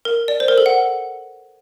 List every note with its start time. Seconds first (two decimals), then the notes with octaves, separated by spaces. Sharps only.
0.05 A#4
0.28 D5
0.40 C5
0.48 A#4
0.58 A4
0.66 F#5